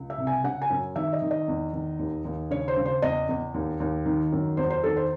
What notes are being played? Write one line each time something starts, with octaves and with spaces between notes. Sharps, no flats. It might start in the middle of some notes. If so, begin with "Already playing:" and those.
Already playing: C#2
E5
C2
G#5
C#3 F#5
G#5
F#2
D#3 E5
D#5
D#3
D#5
E2
D#3
D#2
D#2
C#3 C#5
C5
C#3
C5
E2 D#5
E2
D#2
D#2
D#3
F#2
E2 C5
C5
D#3 A4
C5